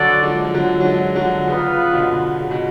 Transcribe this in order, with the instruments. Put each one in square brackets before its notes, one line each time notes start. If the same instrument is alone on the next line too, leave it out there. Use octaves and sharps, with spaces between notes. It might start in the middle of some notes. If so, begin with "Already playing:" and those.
Already playing: [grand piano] D3 F#3 [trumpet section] F#4 A4 D5 F#5
[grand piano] F3 G#3
F3
D3 F#3
F#3
F3 G#3
D3 F#3
[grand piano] C#3 F3 [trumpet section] B3 F4 B4 F5
[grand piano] B2 D3
C#3
B2